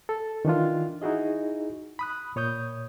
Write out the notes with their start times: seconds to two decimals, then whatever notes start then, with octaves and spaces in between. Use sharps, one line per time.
0.09 A4
0.45 D#3 E3 D4 F4
1.02 D#4 E4 F#4 G#4 D#5
1.99 B5 D#6 F#6
2.36 A#2 C#5 D#6 G6